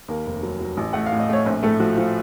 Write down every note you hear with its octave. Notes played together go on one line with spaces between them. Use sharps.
D#2 A#3 A#4
F1
F#3
F#3
A1
A3 F#5
F5
A2
D#5
A3 C#5
A#1 C4 C5
A2 A3 A4
F3 F#4
F3 F4